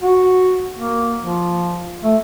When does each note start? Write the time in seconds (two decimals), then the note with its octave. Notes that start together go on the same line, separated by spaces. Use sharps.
0.02 F#4
0.78 A#3
1.22 F3
2.03 A3